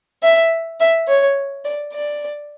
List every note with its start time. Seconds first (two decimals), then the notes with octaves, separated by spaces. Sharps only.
0.23 E5
0.80 E5
1.08 C#5
1.65 D5
1.93 D5